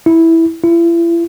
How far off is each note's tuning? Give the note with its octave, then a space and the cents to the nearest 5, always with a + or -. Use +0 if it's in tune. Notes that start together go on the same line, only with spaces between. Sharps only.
E4 -5
E4 +40